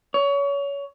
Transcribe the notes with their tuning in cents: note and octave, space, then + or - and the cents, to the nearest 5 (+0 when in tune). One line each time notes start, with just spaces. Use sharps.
C#5 +25